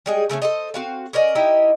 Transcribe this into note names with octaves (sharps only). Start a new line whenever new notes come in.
G3 G#3 G#4
C#3 A3 C4 C#4
A4 C5 D#5
C4 F#4 F5
C#4 A#4 D5 D#5
D#4 E4 G4 D#5